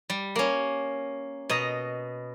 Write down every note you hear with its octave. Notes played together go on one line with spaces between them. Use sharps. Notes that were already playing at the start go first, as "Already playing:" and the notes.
G3
A#3 C#4
B2 D#5 A#5